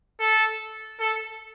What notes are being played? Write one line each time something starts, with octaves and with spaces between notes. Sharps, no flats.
A4
A4